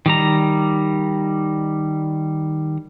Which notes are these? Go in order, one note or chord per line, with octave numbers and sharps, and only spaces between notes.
D#3 G3 A#5